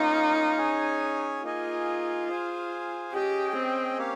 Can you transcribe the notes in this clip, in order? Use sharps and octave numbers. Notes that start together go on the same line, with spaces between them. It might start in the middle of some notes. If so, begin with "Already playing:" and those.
Already playing: A#3 C#4 D#4 F4 A#4 F5
C#4 G#4 C#5 G#5
A#3 D#4 F4 G#4 D#5 G#5
G#4 C5 F5 G#5
C#4 G4 G#4 D#5 G5
C4
A#3 C#4 G4 C#5 F5